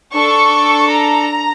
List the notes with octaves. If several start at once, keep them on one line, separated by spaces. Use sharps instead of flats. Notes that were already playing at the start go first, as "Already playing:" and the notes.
D4 A4 C#6
A#5